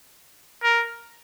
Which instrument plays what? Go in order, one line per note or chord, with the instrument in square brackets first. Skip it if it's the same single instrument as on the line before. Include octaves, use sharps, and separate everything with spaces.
[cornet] A#4